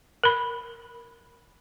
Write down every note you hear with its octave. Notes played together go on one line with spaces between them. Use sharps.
A#4 B5